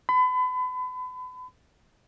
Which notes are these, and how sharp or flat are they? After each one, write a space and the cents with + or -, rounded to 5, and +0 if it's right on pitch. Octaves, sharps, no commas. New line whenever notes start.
B5 +35